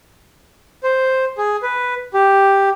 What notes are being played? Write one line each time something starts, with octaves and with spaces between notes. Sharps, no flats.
C5
G#4
B4
G4